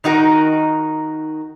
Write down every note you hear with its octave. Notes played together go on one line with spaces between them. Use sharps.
D#3 D#4 F#4 A#4